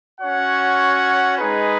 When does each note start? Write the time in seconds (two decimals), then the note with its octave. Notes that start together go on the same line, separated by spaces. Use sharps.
0.21 C#4 F#4 C#5 F#5
1.38 G#3 D#4 G#4 B4